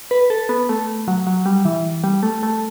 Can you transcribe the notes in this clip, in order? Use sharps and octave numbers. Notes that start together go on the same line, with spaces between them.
B4
A4
B3
A3
F#3
F#3
G3
E3
G3
A3
A3